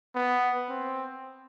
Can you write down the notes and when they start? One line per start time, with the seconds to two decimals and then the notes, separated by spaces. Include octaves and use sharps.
0.15 B3
0.69 C4